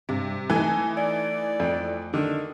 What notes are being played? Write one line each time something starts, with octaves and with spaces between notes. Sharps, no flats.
G2 C3
E3 A3 D#4 G#5
D5
F2
D3 D#3